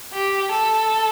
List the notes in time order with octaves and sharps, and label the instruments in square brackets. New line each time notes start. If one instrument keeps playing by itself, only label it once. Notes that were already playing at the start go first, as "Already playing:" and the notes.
[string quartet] G4
A4